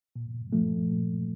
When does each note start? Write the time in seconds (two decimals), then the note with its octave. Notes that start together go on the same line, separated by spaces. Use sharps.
0.16 A#2
0.53 F3 A3
0.90 A#2